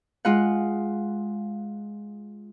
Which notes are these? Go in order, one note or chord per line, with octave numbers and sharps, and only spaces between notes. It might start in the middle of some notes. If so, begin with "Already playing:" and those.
G#3 F4 F#5